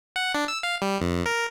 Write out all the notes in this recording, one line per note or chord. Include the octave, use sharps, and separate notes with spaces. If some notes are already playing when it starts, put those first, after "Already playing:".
F#5
D4
E6
F5
G3
F2
A#4